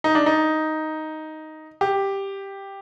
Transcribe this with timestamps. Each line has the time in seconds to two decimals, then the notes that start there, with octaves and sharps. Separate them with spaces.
0.04 D#4
0.15 D4
0.26 D#4
1.81 G4